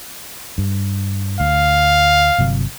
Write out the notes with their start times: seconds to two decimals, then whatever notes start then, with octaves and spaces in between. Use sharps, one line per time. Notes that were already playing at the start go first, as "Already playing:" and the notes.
0.58 G2
1.40 D2 F5
2.38 G1 C3 F#3